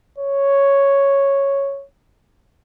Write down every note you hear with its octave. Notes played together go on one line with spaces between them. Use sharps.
C#5